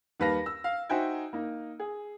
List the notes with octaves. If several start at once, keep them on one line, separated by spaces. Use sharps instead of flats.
D#2 G3 B4 F5 A5 A#6
E6
F5
D#4 F#4 C5 E5 G5 G#5
A#3 D#4
G#4